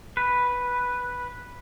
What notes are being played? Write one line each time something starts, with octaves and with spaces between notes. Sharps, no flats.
B4